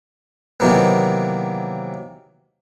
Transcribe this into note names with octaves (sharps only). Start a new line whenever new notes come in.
C3 D#3 E3 F#3 A#3 B3